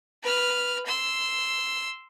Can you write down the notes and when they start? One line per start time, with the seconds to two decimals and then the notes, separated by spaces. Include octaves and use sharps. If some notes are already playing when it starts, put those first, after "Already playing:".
0.22 B4 F6
0.86 C6 E6